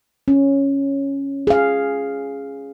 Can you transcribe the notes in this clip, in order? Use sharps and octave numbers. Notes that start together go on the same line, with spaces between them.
C#4
G#4 F5